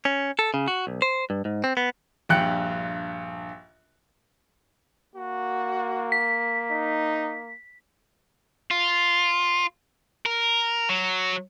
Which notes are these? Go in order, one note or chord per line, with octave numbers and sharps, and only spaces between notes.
C#4
A4
C#3
F#4
B1
C5
G2
G#2
C4
B3
A#1 G2 G5 F#6 C#7
A#3 F#4
B6
D#4
F4
A#4
F#3